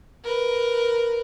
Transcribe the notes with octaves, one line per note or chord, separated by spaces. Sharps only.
A#4 B4